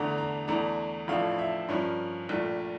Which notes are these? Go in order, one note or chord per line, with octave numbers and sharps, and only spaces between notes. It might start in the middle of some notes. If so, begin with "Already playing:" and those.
Already playing: E2 D3 A3 D4 A#5
A#5
E2 E3 A3 D4 A#5
A1 A2 F3 A3 D4 F5
E5
G2 F3 C#4 A#4
A#1 A#2 A3